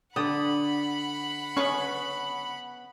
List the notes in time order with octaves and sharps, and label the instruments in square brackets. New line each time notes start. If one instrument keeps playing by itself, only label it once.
[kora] D3 D5 G5 [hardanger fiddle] F#5 B5 [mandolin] D#6
[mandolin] B3 B4 C#6 [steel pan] C#4